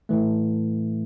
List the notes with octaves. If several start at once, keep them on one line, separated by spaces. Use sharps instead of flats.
A2 E3 A3